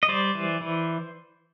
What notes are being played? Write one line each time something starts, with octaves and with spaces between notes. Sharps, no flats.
D#5
G3 C5 D5
E3
E3